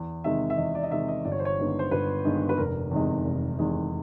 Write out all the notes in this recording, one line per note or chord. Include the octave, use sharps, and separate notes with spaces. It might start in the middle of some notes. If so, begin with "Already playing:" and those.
Already playing: E2
C3 D#3 G#3 E5
E5
E2 D#5
D5
D#5
C3 D#3 G#3 E5
D#5
G1 D5
C#5
C5
C#5
G2 D#3 G#3 B3
C5
G1 B4
G2 D#3 G#3 B3
B4
F1 A#4
E2 C3 D#3 G#3
F1
E2 C3 D#3 G#3